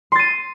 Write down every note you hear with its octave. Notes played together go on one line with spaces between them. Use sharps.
C6 A6 D#7